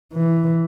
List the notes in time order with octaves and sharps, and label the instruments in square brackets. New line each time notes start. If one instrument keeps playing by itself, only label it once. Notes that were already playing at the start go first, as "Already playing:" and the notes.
[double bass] E3